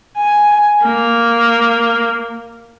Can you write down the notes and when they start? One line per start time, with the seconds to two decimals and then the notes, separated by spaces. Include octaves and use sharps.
0.18 G#5
0.84 A#3